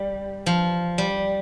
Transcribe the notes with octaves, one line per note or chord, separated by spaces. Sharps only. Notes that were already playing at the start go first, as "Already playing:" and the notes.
Already playing: G3
F3
G3